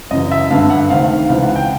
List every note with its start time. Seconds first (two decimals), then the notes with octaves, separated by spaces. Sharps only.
0.11 F#2 C#3 E3 D#5
0.31 E5
0.50 G2 D3 F5
0.70 F#5
0.90 D2 C3 D#3 F5
1.29 C#2 C3 E3 F5
1.43 F#5
1.56 G5